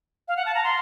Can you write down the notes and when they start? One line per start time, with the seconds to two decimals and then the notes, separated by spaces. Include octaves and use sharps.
0.28 F5
0.37 F#5
0.46 A5
0.55 A#5
0.64 C6